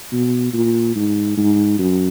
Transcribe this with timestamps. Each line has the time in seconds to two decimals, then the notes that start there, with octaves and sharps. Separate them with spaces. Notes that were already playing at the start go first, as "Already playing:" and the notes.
0.12 B2
0.53 A#2
0.95 G#2
1.37 G#2
1.79 F#2